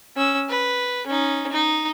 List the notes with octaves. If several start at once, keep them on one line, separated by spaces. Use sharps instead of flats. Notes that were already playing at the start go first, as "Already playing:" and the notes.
C#4 E6
B4
C#4 D#4
D#4